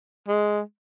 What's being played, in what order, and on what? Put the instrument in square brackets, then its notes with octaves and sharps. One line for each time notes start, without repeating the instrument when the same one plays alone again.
[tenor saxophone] G#3